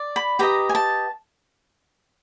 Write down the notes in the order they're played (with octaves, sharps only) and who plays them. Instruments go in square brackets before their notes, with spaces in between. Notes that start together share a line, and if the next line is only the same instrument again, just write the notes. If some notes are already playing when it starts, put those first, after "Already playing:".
Already playing: [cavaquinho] D5
B5
G4 B4 D#5 A#5
G#5
A5